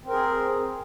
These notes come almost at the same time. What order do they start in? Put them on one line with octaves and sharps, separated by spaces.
C4 A#4 G#4